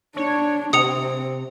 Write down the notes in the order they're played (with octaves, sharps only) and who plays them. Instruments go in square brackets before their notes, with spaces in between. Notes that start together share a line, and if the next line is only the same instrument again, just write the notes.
[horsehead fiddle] D4 [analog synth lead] C#5
[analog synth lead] C3 [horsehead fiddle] C4 [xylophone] D#6 C#7 F7